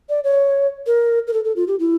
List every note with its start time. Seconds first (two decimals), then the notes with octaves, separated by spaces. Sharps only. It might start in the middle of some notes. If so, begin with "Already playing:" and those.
0.09 D5
0.24 C#5
0.87 A#4
1.27 A#4
1.33 A4
1.44 A4
1.56 F4
1.68 G4
1.79 E4